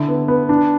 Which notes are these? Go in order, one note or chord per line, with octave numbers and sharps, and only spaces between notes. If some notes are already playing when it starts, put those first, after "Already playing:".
Already playing: D3 E4
B3
B3
D4